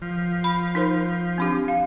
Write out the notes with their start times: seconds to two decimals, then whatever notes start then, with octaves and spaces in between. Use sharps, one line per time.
0.02 F3
0.44 B5
0.75 D#4 A#4 C5
1.38 C4 D4 G4
1.68 F5